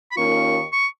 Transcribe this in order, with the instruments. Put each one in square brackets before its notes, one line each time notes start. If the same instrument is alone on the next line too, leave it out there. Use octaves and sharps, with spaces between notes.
[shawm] B5
[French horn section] D#2 D#3 A#3 C#4 F4 [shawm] C#6
[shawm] C#6